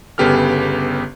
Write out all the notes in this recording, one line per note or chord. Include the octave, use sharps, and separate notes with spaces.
G1 C#3 B3 G4 A4 F6